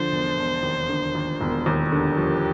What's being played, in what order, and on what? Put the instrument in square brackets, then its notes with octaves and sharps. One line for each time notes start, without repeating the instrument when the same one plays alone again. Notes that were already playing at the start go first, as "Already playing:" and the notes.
Already playing: [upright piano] D3 F3 [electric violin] C5
[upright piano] E1
E1
D#2
D3
D#2
E1
D#2
[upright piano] D3 [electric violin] G4
[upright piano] F3